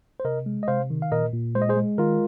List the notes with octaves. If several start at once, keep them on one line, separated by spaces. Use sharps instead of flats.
C5
C3 A#4 D#5
G#3
D#5
C3 C5 F5
D#3
F5
A#2 A#4 D#5
A#2
G#3 C5
D#5
G#4 C5
G#3
D#3 F4 A#4